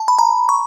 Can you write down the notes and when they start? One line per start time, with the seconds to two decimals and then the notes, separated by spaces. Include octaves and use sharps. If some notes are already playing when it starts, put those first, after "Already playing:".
Already playing: A5
0.08 B5
0.19 A#5
0.49 C#6